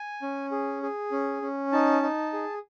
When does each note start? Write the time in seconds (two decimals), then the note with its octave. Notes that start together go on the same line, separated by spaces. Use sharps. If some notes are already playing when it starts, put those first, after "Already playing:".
Already playing: G#5
0.22 C#4
0.51 G#4
0.82 G#4
1.12 C#4
1.42 C#4
1.72 D#4 A5
2.03 D#4
2.33 G#4